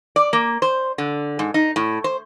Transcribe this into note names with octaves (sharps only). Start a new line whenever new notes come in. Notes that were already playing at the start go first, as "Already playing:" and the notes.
D5
A#3
C5
D3
G#2
D#4
A2
C5